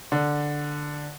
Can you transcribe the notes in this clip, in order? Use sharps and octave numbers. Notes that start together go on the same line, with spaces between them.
D3